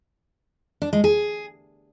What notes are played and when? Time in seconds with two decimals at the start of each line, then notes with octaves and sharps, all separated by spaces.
0.82 D4
0.93 G#3
1.04 G#4